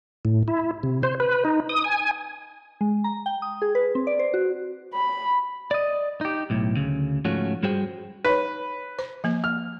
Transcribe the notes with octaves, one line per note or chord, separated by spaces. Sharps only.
A2
E4
C3
C5
B4
D#4
D#6
G#5
G#3
A#5
G5
D#6
G#4
B4
C4
D5
C5
F#4
B5
D5 D#5
D#4 G4
B1 A2
D2 C#3
G#2 F3 A3 C#4 F#4
G2 G3 F#4 G#4 C5 G5
D#4 B4 C#5
C5
F3 A#3
F6